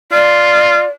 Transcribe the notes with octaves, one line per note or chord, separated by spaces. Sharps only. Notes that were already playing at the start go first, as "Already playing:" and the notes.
F4 D5